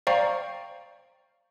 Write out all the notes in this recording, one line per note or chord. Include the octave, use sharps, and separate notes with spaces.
C5 D5 F5 G5 A#5 C#6